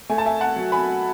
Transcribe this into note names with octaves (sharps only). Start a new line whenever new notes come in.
A3 G#5
A5
E5 G#5
F#5 A5
F#3
G#5 B5